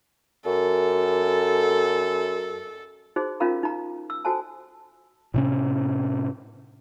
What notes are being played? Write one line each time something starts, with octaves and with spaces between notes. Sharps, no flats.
F#2 A4
D#4 F#4 G#4 C5
C#4 D#4 F4 A#4 F5 A#5
D#4 A#5
E6
F#4 A4 C5 G#5 A5
A2 C3 C#4